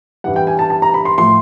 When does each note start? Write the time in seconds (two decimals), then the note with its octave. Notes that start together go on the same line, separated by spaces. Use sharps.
0.24 G2 E3 G3 F#5
0.36 G5
0.47 G#5
0.59 A5
0.70 A5
0.82 A#5
0.94 B5
1.05 C6
1.18 A2 F3 C6